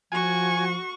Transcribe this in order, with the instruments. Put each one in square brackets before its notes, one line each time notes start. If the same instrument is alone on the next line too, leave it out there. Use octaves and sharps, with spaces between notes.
[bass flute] F3 [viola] F#4 C#6 [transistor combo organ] G#5